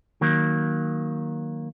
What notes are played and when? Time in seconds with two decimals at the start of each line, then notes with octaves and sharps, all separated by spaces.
0.21 D#3 F#3 A#3